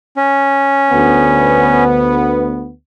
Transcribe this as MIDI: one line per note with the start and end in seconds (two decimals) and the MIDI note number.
0.17 1.84 61
0.92 2.70 38
0.92 2.70 59